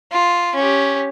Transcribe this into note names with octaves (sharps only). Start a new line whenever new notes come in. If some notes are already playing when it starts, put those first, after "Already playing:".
F4
C#4 G4